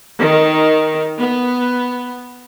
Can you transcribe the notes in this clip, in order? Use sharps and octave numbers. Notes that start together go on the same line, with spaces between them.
D#3
B3